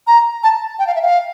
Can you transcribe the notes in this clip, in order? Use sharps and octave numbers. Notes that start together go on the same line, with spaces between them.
A#5
A5
G5
F5
E5
F5